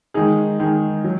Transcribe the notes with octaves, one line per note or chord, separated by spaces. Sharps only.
D#3 G#3 D#4 G#4
D#3 G#3 D#4 G#4
F#3